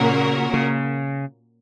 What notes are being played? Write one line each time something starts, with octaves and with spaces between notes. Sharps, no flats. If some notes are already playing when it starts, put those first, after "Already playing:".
Already playing: A#2 C#3 A#3 C#4 F#4 A#4
C#3